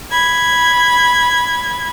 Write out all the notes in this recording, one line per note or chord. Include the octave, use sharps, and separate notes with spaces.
B5 G#6